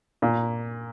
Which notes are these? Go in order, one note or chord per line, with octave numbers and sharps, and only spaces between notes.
A#2